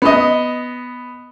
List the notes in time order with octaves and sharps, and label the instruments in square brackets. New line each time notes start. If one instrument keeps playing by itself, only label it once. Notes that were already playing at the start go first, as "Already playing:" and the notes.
[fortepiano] B3 D#5